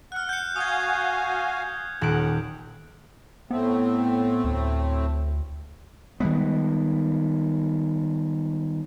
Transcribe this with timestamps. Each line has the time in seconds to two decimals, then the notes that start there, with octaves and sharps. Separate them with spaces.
0.12 F#5 F6 F#6
0.29 G6 C#7
0.56 F#4 F5 G#5 D#6 G#6
2.01 D#1 C#4 F#5 F#6 D7
3.51 A2 A3 B3 C4
4.44 D2
6.20 D#3 G3 G#3 B3